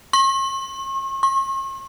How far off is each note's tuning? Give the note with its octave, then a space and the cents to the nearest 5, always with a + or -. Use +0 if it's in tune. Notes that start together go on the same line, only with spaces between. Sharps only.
C#6 -45
C#6 -45